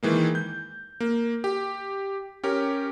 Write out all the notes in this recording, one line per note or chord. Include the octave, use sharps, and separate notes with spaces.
D#3 E3 G#3 A#3
G6
A#3
G4
C#4 G4 A#4